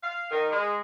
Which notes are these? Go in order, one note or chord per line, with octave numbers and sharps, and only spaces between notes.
F5
D#3
G#3